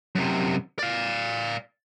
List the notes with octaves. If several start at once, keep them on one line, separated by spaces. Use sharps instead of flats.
F#2 C3
D5 F5